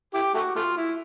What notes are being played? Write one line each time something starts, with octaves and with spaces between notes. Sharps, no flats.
E4 G4
A3 F#4
A3 F4
E4